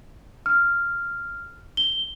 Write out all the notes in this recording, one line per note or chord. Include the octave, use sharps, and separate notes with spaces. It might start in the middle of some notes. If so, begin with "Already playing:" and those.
F6
G7